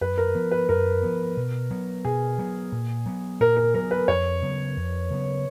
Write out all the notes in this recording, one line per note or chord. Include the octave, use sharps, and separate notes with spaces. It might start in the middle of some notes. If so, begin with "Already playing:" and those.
F#2 B4
A#4
F3 B3
B4
F#2 A#4
F3 B3
B2
F#3 B3
B2 G#4
F#3 B3
A#2
F#3 B3
A#2 A#4
A#4
F#3 B3 A#4
B4
F2 C#5
C#3 F#3 B3
F2
C#3 F#3 B3